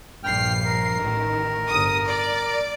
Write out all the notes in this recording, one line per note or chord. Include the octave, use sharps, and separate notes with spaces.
A#1 G2 G5 F6 C7
A#4
A1 D#3
G1 D#6
D5